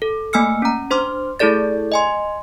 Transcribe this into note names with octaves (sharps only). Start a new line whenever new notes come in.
A4
A3 A#3 G#5 E6 F6 C#7
C#4 A#5
D4 C5 C6 D6 F6
A3 E4 G#4 A4 D5 A6
D#5 G#5 C6